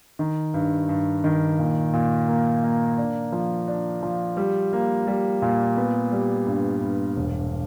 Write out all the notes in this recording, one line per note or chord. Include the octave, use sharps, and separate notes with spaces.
D#3
G2
G2
D#3
A#2
A#2
A#3
A#3
D4
F3
D4
F3
G3
A#3
G3
A#2
B3
G3
G2
G2
E1